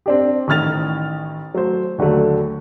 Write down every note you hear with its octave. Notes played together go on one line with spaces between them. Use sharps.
C4 D4 G4
A1 D#3 F6 A6 F7
F#3 A3 C5
D#2 D3 F#3 A3